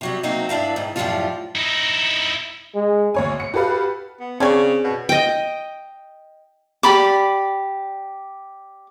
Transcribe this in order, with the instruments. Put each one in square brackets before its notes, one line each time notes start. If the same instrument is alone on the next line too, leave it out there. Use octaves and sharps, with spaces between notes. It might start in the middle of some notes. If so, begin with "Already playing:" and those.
[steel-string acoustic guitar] C3 F#3 G3
F#3 A3 A#3 C4 D#4
G2 D4 E4 F5
G#2 D#3
F#2 A2 D#3 F3 G3 F4
[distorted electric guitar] D#4 E4
[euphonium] G#3
[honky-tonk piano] D2 C#5 G#5
C#7
F#4 G4 A4 B4 F5
[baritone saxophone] B3
[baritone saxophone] C#3 [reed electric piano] C4 G#4 [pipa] D4 G#5 C#6
[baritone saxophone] B2
[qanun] D#5 G5
[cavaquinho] G4 D5 B5 D6